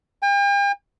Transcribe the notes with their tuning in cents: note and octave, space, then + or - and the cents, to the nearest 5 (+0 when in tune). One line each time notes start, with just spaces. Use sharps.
G5 +45